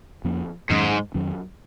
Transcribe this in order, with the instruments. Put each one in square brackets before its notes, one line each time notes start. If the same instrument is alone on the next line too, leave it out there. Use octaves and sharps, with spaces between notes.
[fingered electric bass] F2 F3 A#3 C#4
[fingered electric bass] F2 D#3 F#3 C#4 [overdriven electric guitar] G#2
[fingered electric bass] F2 D#3 F#3 C#4